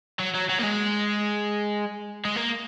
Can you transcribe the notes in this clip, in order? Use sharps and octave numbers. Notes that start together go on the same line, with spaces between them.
F#3
F#3
F#3
A#3
G#3
G#3
A#3